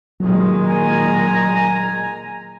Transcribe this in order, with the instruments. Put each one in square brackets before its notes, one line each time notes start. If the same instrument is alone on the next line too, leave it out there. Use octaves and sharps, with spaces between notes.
[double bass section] A#2 D#3 G#3 [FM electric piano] F#3
[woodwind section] G#5 [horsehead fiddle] A#5